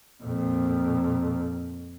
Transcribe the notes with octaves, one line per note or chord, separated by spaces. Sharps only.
F2 A#2